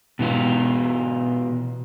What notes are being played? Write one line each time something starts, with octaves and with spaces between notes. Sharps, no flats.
B2 E3 F4